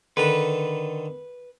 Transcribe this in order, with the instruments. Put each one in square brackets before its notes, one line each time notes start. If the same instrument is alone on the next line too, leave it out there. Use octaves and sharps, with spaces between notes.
[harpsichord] D3 D#3 A4 [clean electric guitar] B4